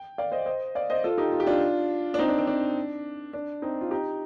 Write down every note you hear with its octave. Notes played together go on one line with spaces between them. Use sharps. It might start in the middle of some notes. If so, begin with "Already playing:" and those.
Already playing: G5
D5 F5
C5 D#5
C5 D#5
D5 F5
C5 D#5
F4 A4
D#4 G4
F4
G4
D4 F4
D4
C4 D#4
D4
C4
D4
D4
C4 D#4
F4
D#4 G4